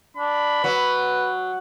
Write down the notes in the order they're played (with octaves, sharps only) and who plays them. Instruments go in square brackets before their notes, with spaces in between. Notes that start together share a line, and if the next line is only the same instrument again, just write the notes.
[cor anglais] D4 [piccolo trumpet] B5
[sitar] F#3 [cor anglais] B4